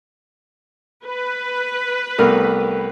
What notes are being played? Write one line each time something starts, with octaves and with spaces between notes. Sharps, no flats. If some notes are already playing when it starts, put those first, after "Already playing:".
B4
C2 A3 B3 A#4